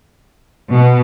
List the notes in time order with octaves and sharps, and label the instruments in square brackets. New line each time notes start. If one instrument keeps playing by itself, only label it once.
[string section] B2